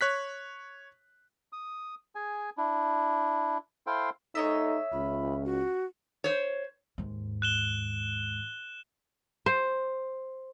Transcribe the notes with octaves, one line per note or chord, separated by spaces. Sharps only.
C#5 F#6 B6
D#6
G#4 G#5
D4 E4
E4 A4 C5 F5 G5 C6
D#4 A4 C#5 D#5 E5 C#6
C#2 C#4 F4 B5
F#4
C5 C#5
D#2 G#2
F#6 E7 G7
C5